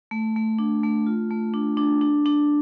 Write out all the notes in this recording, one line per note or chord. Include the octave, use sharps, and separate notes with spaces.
A3
A3
D4
A3
F4
A3
D4
D4
D4
D4